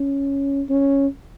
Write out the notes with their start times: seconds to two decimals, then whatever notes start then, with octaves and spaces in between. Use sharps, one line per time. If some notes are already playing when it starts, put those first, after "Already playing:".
Already playing: C#4
0.69 C#4